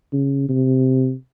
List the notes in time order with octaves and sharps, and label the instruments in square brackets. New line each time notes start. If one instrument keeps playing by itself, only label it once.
[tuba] C#3
C3